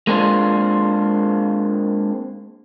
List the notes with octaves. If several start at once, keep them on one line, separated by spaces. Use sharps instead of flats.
G#3 A#3 C4 D4 F4